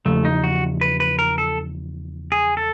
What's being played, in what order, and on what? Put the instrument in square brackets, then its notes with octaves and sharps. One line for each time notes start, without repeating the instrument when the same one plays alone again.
[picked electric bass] E2 C#3 F3 [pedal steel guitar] A3
[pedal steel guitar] D#4
F#4
B4
B4
A#4
A4
G#4
A4